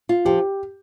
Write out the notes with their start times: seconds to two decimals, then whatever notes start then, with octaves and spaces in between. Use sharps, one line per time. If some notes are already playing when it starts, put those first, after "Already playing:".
0.09 F4
0.25 F3 G4